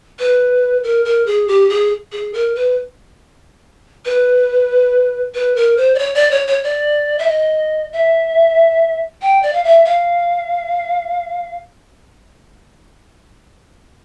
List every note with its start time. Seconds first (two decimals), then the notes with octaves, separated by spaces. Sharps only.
0.19 B4
0.83 A#4
1.05 A#4
1.26 G#4
1.48 G4
1.70 G#4
2.12 G#4
2.34 A#4
2.55 B4
4.05 B4
5.34 B4
5.56 A#4
5.77 C5
5.95 D5
5.99 C#5
6.15 D5
6.31 C#5
6.47 C#5
6.63 D5
7.19 E5
7.27 D#5
7.93 E5
9.22 G5
9.43 D5
9.53 F5
9.64 E5
9.85 F5